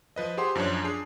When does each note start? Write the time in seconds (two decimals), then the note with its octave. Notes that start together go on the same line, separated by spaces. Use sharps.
0.16 F3 B4 D#5
0.37 G4 G#4 C5 F#5 C6
0.55 F#2 F3 D4 C5 C#5
0.84 D4 G#4 C7